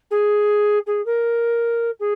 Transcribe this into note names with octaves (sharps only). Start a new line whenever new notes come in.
G#4
G#4
A#4
G#4